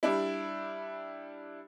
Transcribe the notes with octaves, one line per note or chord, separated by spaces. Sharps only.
G3 D4 E4